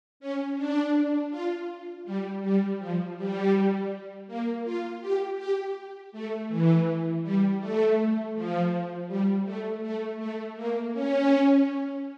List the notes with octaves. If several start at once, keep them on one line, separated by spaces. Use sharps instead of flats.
C#4
D4
F4
G3
G3
F3
G3
A#3
F4
G4
G4
A3
E3
G3
A3
F3
G3
A3
A3
A3
A#3
C#4